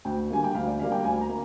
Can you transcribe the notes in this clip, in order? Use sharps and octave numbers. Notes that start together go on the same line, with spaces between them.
D2 G5
D3 G3 A#3 G#5
G5
D2 F5
D5
D3 G3 A#3 F5
G5
D2 G#5
A#5
A#3